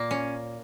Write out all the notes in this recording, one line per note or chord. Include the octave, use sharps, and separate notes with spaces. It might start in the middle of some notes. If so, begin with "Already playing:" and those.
Already playing: A#2 A#3
C#4